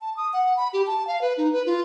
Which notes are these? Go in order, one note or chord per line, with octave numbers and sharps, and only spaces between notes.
A5
D#6
F#5
B5
G4
A5
F5
B4
D#4
B4
F4